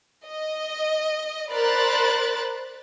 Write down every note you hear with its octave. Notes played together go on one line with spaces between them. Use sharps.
D#5
A#4 C5 D5 B5 F#6 A6